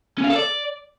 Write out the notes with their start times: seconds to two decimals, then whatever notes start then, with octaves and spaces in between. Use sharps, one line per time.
0.18 C#4
0.24 F5
0.30 A4
0.35 D5